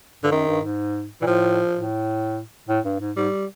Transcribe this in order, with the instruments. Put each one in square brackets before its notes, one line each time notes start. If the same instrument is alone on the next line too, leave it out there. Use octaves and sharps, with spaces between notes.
[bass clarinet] G2 [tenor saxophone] D3
[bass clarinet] F#2 [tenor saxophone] D#3
[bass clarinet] G2
G#2
[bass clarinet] A#2 [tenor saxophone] E3
[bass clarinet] A2 [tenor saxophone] F3
[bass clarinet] A2
A2
G2
G#2
[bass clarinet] G#2 [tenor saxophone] G3